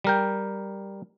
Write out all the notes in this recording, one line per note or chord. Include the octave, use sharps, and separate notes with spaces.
G3 A#4 G5